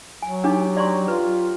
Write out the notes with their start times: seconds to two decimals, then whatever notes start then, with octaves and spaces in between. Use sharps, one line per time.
0.22 F#3 G#5
0.44 D4 D#4 G4
0.77 D5 A#5 C6 C#6
1.08 F4 B4